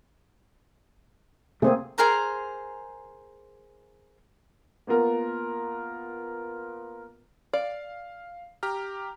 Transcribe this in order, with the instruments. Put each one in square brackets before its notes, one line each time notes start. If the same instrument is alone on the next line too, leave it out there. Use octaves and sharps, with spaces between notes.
[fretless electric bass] C3 A3 [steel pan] A#3 C4 G#4
[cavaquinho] G#4 A#4 C5 A#5
[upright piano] A#3 B3 F4 A#4
[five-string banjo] D5 [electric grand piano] F5
[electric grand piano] G4 A#5 F6